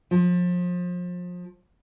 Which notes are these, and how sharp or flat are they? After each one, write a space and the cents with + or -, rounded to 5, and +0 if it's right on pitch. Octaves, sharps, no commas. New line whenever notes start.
F3 +30